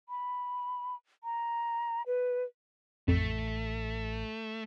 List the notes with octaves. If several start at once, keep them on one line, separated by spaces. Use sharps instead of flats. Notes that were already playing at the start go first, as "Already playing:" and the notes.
B5
A#5
B4
A1 F2 A3